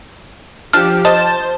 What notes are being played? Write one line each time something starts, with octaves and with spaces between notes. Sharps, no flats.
F3 D4 G4 A5 F6
C5 D#5 A5